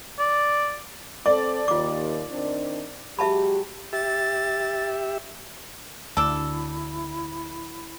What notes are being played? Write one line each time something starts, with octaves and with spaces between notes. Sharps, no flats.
D5
C4 A4 D5 D6
D#2 F4 D6
D#3 C4 D4
F#3 G#3 G4 E5 A5 B5
G4 E5 A6
D2 D4 E4 A4